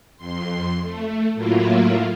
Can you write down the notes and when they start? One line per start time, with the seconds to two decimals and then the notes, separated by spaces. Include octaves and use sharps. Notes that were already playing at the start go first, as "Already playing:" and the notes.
0.17 F2 C6
0.82 A3
1.34 A2 F#3 A#3 E4 F4